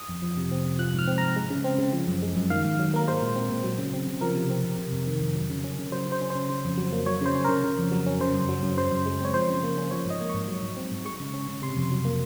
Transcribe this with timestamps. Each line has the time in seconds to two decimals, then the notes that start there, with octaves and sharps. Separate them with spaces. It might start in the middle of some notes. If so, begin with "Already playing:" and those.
Already playing: D#6
0.09 F2
0.22 F3
0.37 C3
0.51 C4
0.65 C3
0.79 F3 F#6
0.93 G#2
0.99 F6
1.08 C4
1.18 G#2 A#5
1.36 G#3
1.50 C#3
1.64 C4
1.79 C#3
1.93 F3
2.07 F#2
2.22 G#3
2.36 F#2
2.50 D#3 F5
2.64 G#2
2.79 F#3
2.94 A#3 A#4
3.07 G#3 C5
3.21 A#2
3.36 C4
3.50 A#2
3.64 F#3
3.78 C#3
3.93 C4
4.07 C#3
4.21 F3 A#4
4.35 C3
4.50 C4
4.64 C3
4.78 C3
4.92 F2
5.07 D#3
5.21 F2
5.35 F#3
5.50 C#3
5.64 C#4
5.79 C#3
5.92 F#3 C5
6.06 C#3
6.12 C5
6.21 C#4
6.30 C5
6.35 C#3
6.50 C#3
6.64 F2
6.77 F#3
6.92 A#3
7.06 F#3 C#5
7.21 C#3 C5
7.35 C#4
7.44 C#3 A#4
7.64 C#3
7.78 F2
7.92 F#3
8.07 C#4
8.20 C#3 C5
8.34 F#2
8.49 F#3
8.63 F#2
8.77 C#3 C5
8.91 F#2
9.06 G#3
9.20 C4 C#5
9.34 F3 C5
9.49 C#3
9.63 A#3
9.77 C#4
9.91 F3 C#5
10.06 G#2 D#5
10.20 A#3
10.29 G#2 C#6
10.48 F#3
10.63 G#2
10.77 C4
10.91 G#2
11.05 G#3 C#6
11.20 C#3
11.34 C#4
11.48 C#3
11.62 C3 C6
11.77 F2
11.91 F#3
12.05 A#3